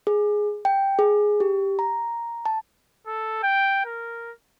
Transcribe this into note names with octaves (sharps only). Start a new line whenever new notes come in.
G#4
G5
G#4
G4
A#5
A5
A4
G5
A#4